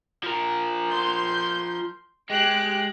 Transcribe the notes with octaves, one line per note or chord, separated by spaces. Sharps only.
F3 A#4
C6 G6
G#3 G4 F#6 D7